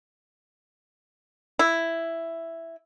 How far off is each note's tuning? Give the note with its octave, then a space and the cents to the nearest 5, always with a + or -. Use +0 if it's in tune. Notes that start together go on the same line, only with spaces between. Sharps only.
E4 +5